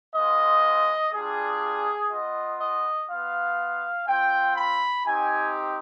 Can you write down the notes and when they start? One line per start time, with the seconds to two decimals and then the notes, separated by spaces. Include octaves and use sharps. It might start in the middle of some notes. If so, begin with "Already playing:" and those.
0.15 G#3 B3 F4 D#5
1.14 G3 D4 F4 G#4
2.11 B3 F4 D#5
2.61 D#5
3.09 B3 F4 F5
4.08 C4 F4 G5
4.56 B5
5.05 C4 D#4 G4 G#5